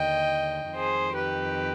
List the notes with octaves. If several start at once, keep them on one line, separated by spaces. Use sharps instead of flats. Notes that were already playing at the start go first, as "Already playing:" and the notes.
Already playing: D#2 D3 D#5 G5
F2 D#3 G#4 C5
G4 B4